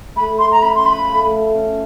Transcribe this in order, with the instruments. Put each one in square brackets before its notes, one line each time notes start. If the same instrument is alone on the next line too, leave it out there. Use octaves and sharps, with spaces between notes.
[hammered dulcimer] A3 [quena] B5
[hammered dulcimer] A3 [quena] C6
[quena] A#5
[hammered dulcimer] C#4 [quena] B5
[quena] C6
[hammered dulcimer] F3 [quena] B5
[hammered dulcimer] A3
A3
C#4